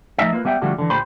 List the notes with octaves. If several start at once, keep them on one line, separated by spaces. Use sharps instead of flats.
F3 A3 D#4 D#5 E5
A#3 F4 B4
G3 B3 E5 G5
D3 F3 G3 A3 F#4
D3 E3
D2 A#2 G4 C5 B5